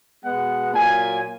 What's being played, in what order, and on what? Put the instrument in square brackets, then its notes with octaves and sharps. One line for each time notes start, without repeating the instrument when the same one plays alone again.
[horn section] B2 G#3 B3 F#5
A#2 F#3 A#3 G#5